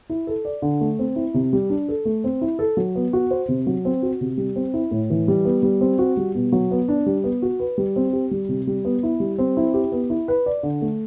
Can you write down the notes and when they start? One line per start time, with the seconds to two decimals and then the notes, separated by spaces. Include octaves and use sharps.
0.10 E4
0.27 A4
0.45 D5
0.62 D3
0.81 A3
0.99 C4
1.16 E4
1.34 C3
1.53 G3
1.70 D4
1.89 A4
2.05 A3
2.24 C4
2.41 E4
2.59 A4
2.77 F#3
2.95 B3
3.13 F#4
3.31 C5
3.48 C3
3.67 F#3
3.85 C4
4.02 F#4
4.21 C3
4.38 G3
4.56 C4
4.74 E4
4.91 A2
5.10 E3
5.28 G3
5.45 B3
5.63 G3
5.81 C4
5.99 F#4
6.17 G3
6.35 B2
6.52 F#3
6.71 B3
6.88 D4
7.06 G3
7.24 B3
7.42 F#4
7.60 B4
7.78 G3
7.96 C4
8.13 G4
8.31 G3
8.49 C3
8.67 G3
8.85 B3
9.03 E4
9.20 G3
9.38 C4
9.57 E4
9.74 G4
9.92 B3
10.10 E4
10.28 B4
10.46 D5
10.63 D3
10.82 A3